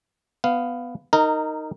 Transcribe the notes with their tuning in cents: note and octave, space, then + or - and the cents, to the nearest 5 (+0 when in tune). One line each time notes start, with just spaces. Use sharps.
B3 +10 F5 -5
D#4 +0 A#4 -20